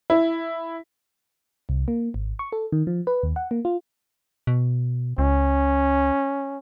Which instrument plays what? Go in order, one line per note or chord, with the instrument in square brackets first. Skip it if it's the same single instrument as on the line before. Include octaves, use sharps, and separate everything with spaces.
[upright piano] E4
[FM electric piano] C2
A#3
G#1
C#6
A4
D#3
F3
B4
D#2
F#5
A#3
F4
[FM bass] B2
[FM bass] C#2 [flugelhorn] C#4